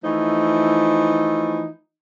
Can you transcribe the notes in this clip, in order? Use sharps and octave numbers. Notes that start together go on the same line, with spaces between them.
E3 F3 A3 D#4